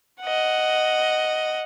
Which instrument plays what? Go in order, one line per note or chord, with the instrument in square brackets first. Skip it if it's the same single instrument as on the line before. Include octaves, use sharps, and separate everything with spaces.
[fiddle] D#5 F#5